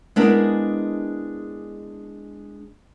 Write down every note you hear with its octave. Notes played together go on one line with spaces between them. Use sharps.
G#3 B3 D4 E4 G#4 A#4